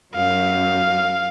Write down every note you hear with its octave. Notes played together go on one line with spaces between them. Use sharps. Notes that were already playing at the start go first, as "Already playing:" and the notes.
F#2 F5